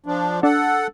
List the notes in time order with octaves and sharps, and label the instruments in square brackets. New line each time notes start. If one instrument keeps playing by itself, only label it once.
[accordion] F3 D4
[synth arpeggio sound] D4 [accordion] A4 F#5